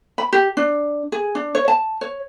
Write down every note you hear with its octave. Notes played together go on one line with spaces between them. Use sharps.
B5
G4
D4
G#4
D4
C#5
A5
C#5